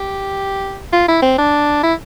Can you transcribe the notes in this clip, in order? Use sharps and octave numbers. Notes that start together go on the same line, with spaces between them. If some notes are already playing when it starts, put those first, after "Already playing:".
Already playing: G4
F4
E4
C4
D4
E4